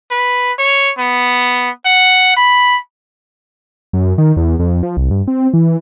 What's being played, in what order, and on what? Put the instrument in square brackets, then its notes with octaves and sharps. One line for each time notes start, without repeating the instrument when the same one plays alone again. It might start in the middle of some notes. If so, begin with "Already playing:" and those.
[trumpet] B4
C#5
B3
F#5
B5
[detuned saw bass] F#2
D#3
E2
F2
F3
C2
G2
C4
E3